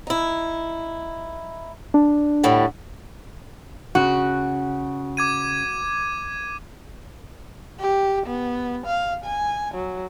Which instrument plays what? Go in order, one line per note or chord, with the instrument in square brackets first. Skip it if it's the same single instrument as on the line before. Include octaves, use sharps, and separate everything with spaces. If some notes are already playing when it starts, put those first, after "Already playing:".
[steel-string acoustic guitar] D#4 E4
[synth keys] D4
[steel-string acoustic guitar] A2 D3 G3
[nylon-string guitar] C#3 [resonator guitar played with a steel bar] F#4
[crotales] D6 G#6 D#7
[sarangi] G4
B3
F5
G#5
F#3